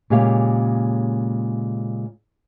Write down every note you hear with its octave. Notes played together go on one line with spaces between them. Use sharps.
A#2 C#3 G#3 G4 C#5 F5